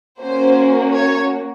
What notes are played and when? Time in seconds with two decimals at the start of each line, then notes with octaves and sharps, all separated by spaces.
0.20 A#3 C#4 F#4 C5
0.93 C#5